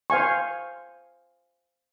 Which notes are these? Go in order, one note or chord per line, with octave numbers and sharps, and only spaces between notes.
C5 F5 G#5 C#6